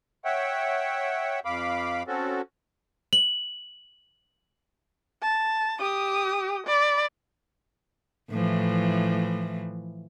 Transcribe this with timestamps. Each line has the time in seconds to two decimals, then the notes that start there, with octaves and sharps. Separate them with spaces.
0.25 C#5 E5 F#5 G5
1.45 F2 F5 B5 D6
2.07 C4 C#4 F#4 A4
3.13 F#7
5.22 A5
5.80 G4 D#6
6.67 D5 B5
8.31 A2 E3 F3